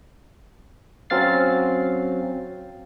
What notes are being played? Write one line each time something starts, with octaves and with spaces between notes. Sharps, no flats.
F#3 C4 C#4 F5 A6 C7